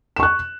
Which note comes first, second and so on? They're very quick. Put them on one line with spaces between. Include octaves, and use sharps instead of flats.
E7 C#6 F#6